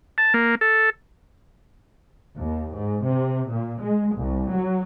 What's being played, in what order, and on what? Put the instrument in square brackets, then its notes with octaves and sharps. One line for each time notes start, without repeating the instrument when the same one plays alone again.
[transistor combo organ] A5
A#3
A4
[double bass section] D#2
G#2
C3
A#2
G#3
C2
F#3